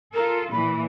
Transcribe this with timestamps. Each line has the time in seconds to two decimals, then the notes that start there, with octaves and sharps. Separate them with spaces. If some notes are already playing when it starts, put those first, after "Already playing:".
0.14 F4 A4 A#4
0.52 A#2 E3 B5